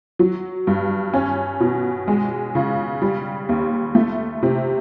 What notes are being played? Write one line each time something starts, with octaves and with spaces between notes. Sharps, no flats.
F#3
G2
C#4
B2
G#3
C#3
G3
D#2
A3
C3